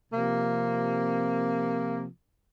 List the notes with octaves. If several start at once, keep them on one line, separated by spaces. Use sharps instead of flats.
C3 F3 A#3